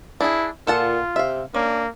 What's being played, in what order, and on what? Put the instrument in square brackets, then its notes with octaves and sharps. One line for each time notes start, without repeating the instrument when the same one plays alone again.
[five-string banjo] D4 G#4 [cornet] E4
[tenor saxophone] A#2 [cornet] F4 [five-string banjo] A4 F#5 A5
[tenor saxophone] C3 [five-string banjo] E5 F5
[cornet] A#3 [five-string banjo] C#4 [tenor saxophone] D4